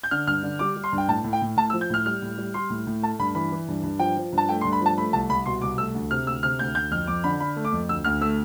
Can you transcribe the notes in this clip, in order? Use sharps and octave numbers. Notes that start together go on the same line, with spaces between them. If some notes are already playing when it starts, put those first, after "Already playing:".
G6
D3 F6
G2 F6
D3
G3 D6
G3
C6
G2
G5
A2 A5
A2
G5
A2
A2 A5
E6
F3
G6
A2 F6
G3 F6
A2
G3
G3 C6
A2
A2
A3 A5
G2 B5
E3 B5
E3
G2
G2
F3 G5
F3
G2
A5
A3 G5
C6
G2
B5
F3 A5
A3 B5
C2 A5
C2 B5
B2 C6
C2 D6
A3 E6
D2
C3 F6
D2 E6
C3 F6
D2 G6
D2 G6
F2 F6
F2 D6
D3 B5
D3 B5
A3
D6
F2
D2 E6
D2 F6
A3 E6